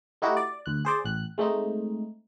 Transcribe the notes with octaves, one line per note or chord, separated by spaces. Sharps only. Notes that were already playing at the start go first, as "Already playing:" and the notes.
A3 D#4 E4 F#4 G4
D5
D2 F#6
G#4 C5 D5
A1 F#6
G#3 A3 C4 D#4